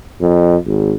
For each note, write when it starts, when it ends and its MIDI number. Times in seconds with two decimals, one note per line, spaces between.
0.21 0.56 41
0.66 0.95 32